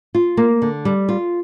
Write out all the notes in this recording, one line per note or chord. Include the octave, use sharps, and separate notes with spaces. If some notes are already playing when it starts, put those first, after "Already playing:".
F4
A#3
D3
G3
F4